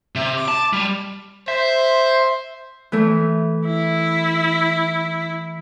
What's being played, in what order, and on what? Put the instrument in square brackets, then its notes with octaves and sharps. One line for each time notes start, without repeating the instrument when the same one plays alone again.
[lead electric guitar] C3 [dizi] E5
[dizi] D6
[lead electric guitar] A5
G3
[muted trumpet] C5 [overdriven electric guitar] E5
[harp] E3 A3
[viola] E4